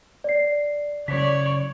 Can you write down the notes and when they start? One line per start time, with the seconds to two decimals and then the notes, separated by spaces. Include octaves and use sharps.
0.24 D5 C7
1.08 C#3 F#3 C#5 D5 B6